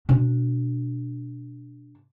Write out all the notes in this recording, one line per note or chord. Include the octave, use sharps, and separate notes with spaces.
B2 D4